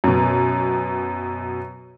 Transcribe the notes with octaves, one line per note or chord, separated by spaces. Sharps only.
F#2 B2